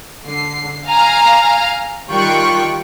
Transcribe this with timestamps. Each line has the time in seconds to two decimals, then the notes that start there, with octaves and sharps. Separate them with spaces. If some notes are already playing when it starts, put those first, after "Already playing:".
0.25 D3 C7
0.87 F5 G#5 A#5 F6
2.10 D#3 G3 F4 G5 C#6 F#6